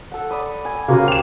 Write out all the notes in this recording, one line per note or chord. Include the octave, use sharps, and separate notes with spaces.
A4 F#5
D5 B5 D#6
G#5
C#3 A#3 F#4 C5
G4 E7 F7